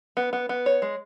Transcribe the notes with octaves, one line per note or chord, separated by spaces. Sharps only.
B3
B3
B3
C#5
G#3